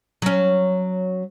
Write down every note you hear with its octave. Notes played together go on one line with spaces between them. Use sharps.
F#3 C#4